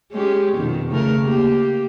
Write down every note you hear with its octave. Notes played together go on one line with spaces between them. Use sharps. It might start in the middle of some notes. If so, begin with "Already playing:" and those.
G#3 C#4 G4
F2 B2 D#3
C#3 A3 A#4
A#3 G4